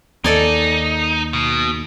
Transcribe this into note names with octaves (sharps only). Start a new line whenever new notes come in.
D#2 D#4 A4 D5 G#5
B2